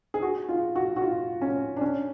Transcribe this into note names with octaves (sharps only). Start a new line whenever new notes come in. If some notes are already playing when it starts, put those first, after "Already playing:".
G#4
F#4
F4
F#4
F#4
F4
C#4
D4
C#4